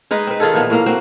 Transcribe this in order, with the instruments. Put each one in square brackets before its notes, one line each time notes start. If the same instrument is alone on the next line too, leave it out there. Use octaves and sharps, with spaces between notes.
[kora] G#3 D#4 B4 D#5
C4 B4
D#3 F4 G#4 A4
A#2 E3 F3 B3
A2 A#3 F5
A#3 C4 F#4 C5